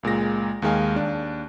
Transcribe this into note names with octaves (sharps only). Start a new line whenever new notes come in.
C#2 A#2 G#3 A#6
D#2 D#3 G#3 F5 G#5
D#2 D4